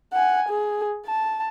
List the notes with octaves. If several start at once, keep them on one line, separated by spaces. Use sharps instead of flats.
F#5 G#5
G#4
A5